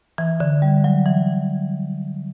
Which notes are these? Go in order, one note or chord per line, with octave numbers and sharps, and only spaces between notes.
E3
D3
G3
F#3
E3